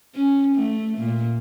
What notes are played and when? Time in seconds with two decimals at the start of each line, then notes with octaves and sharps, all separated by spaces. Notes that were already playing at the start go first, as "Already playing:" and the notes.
0.15 C#4
0.56 A3
0.98 A#2